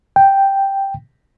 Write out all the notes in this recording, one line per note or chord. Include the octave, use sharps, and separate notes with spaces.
G5